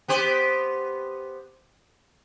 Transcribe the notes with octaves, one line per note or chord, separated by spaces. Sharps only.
B3 G4 C5